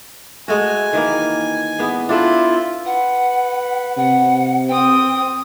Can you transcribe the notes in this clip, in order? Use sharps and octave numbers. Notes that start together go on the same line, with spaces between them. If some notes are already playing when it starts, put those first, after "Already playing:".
G#3 A3 F#4 G#5
D#3 E3 A#3
E3 B3 G#4
D4 E4 F4 A4
B4 F#5
C3 F#5
C4 G5 D#6